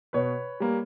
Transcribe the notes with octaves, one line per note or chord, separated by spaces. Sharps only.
B2 B4 C#5
G3 A#3